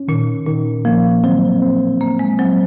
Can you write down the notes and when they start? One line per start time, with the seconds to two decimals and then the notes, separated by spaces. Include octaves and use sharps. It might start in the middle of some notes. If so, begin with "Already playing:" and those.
Already playing: C#4
0.08 A#2 D#3
0.46 A#2 D#3
0.85 F3 A#3
1.24 F#3 C4
1.62 C4
2.01 A#3 C4
2.19 G#3
2.39 F#3 C4